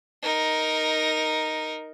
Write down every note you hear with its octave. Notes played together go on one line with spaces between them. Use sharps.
D#4 A#4